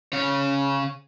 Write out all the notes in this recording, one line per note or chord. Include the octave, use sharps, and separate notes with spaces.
C#3 C#5